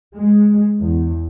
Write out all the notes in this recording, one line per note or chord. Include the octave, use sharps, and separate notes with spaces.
G#3
E2